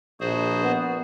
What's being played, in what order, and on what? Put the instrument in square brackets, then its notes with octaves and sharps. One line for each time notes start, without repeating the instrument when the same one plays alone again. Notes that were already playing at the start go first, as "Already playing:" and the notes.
[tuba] A#1 [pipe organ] F#4 G#4 C5
[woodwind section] B3